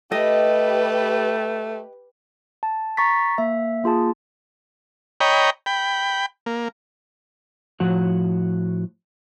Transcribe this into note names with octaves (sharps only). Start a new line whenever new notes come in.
A3 G4 B4 D#5
A5
A#5 C#6 A6 B6
A#3 E5
A#3 F4 G#4 A5
C#5 D#5 G5 A#5 B5
G5 B5
A#3
A2 F3 F#4 F#5